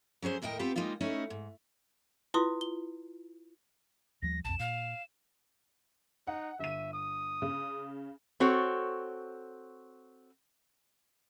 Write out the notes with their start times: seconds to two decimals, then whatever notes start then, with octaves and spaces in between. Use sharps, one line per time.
0.22 F#3 C#4 G#4 C5
0.42 D#2 A2 A#4 D#5 G5
0.59 B3 C4 F4 G4 B4
0.76 G3 G#3 A#3 D#4 F4
1.01 A3 C#4 D#4 E4
1.30 G#2
2.34 E4 F4 B4 C6 D#6
2.61 G7
4.22 D#2 F3 G3 A#6
4.45 B1 F2 A5 E7
4.60 A#2 F5
6.27 D#4 F#5
6.59 G1 E5 D#7
6.94 D#6
7.42 C#3
8.40 C4 F#4 A4 C#5